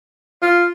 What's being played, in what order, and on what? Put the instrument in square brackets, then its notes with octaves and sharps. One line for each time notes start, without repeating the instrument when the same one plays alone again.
[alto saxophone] F4